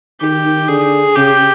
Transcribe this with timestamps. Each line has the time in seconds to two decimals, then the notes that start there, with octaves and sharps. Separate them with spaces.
0.21 D#3 G4
0.44 D#3
0.68 D3 G#4
1.16 C#3 G4